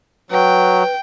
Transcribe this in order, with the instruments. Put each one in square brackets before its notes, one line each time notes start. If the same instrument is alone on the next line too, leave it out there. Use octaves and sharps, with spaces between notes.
[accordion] F#3 [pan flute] B4 [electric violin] G5